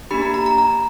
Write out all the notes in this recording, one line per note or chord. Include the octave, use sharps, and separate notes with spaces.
A#3 D4 G4 B5
A#5
A#5
A#5
A#5